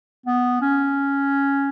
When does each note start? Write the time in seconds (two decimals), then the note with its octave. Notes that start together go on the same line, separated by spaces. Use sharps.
0.26 B3
0.61 C#4